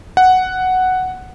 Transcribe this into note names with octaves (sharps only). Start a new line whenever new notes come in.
F#5